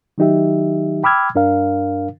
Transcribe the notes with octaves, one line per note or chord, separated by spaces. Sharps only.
D#3 F#3 D#4 G4 E5
G5 B5 D6 E6 F6 G#6
G2 D4 A#4 F5